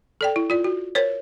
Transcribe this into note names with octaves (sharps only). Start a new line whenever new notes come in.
A4 D5 G5
E4
F4 D5
F#4
A#4 C5 C#5